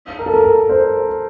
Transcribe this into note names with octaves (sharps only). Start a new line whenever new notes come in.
A#4
A4
A#4
A#4
C5